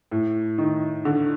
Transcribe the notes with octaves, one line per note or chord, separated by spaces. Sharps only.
A2
D#3
D3